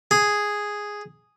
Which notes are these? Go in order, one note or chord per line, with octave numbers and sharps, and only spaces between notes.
G#4